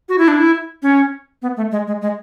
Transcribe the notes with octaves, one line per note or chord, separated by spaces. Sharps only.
F#4
E4
D4
E4
C#4
B3
A3
G#3
G#3
G#3